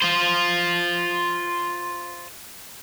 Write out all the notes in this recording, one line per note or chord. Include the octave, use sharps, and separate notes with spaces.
F4 C5